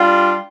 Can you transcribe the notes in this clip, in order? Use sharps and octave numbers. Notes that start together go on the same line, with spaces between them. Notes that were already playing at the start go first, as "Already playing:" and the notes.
Already playing: G3 D4 F4